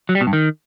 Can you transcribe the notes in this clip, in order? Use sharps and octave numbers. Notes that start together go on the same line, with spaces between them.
F#3
G3
B2
G2
D#3